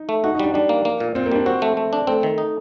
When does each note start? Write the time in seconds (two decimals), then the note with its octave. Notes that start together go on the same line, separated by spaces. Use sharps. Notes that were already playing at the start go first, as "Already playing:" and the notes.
Already playing: D#4
0.09 A3
0.24 D#4 F#4
0.34 D#4
0.39 G3 D4
0.54 G3 D4
0.69 A#3
0.85 A#3
1.00 A#2
1.15 A#2 C4
1.26 A#3
1.32 G3 D4
1.46 C4 F#4
1.62 A3
1.77 A3
1.93 D4
2.07 A3 C4
2.23 D#3
2.38 D#4